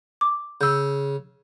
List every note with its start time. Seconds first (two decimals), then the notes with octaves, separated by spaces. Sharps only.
0.21 D6
0.61 C#3 E6 G6